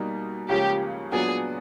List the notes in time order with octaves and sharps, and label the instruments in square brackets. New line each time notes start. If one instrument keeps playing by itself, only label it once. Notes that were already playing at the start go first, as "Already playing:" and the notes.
Already playing: [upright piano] B2 G3 A#3 D#4
[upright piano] C#2 C#3 F3 A#3 C#4 [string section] G4
[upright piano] A#2 F#3 B3 D4 F#4 [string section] G#4